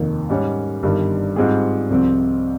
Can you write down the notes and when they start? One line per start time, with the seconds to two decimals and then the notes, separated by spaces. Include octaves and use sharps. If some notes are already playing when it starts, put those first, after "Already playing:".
Already playing: F1 D#2 D#3
0.29 G#2 G3 C#4
0.83 G1 G2 D#3 G3
1.36 G#2 G3 C4 F4 G#4
1.90 C2 C3 F3 C4